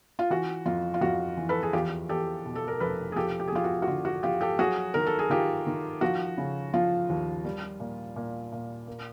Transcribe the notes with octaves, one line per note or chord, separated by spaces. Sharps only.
F4
E3 F#4
F2 F4
F4
F2 F#4
E3
A4 B4
G#4
E2 F4 G4
E2 G4 A4
B2
A4
A#4
F1 A4 B4
G#4
F3 G4 A4
G4
G#4
F3 F4 G4
F#4
F#4
D3 F4
F#4
F3 F4 G4
G4 A4
F#3 F#4 G#4
D#3 A#4
A4
G#4
D#3 F4 G4
D#3
F3 F#4
C#3
F3 F4
D#2
G3
A#2
A#2
A#2
A#3